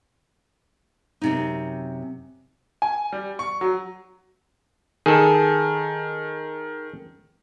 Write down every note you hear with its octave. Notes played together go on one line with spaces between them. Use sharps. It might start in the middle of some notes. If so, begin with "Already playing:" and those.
F#2 C3 D#4
G#5
G3
C#6
F#3
D#3 G#4 A4